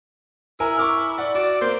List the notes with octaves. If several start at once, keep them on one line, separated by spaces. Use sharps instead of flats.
E4 A#4 G#5
C#6 D6 F6
D5 F#5
F#4 D5
A#3 C5